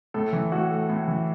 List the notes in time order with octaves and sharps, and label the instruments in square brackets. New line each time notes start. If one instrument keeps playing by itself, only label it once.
[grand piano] A2 A4
E3
A2 F#4
A3
A2
E3